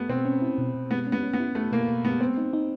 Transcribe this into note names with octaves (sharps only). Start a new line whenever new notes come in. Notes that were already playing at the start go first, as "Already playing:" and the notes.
Already playing: A3 B3
B2 C4
C#4
E4
B2
B2
G#3 B3
C#4
B3
C#4
B3
E4
A3 E4
B2 A#3
B2
G#3 B3
B3 C4
D#4
D#4